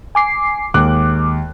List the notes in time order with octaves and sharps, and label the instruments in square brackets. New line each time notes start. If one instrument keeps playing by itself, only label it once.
[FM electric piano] G#5 D6 C7
[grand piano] D#2 G#3 F#6 [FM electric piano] D6